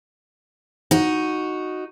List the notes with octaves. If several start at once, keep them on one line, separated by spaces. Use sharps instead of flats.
D#4 F#4